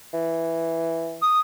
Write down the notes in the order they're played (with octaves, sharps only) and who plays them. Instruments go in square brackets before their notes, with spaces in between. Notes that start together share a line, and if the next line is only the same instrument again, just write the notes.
[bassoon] E3
[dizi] D#6